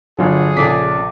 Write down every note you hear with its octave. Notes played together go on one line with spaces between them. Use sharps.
G1 D3 F#3 F4 G#4 F5
A#1 C#3 A4 D5 B6